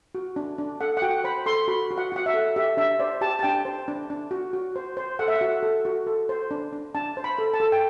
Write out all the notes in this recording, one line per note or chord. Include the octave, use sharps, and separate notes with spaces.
F#4
D4
D4
A4 F#5
F#5
F#4 G5
C5 B5
A4 C6
F#4 B5
F#4
F#5
F#4 F#5
E5
A4
G4 E5
D4 E5
C5 D5
G4 A5
A5
D4 G5
C5
D4
D4
F#4
F#4
C5
C5
A4 F#5
E5
F#5
F#4
A4
F#4
A4
C5
D4
D4
D4 A5
C5
B5
A4
A5
A4
G5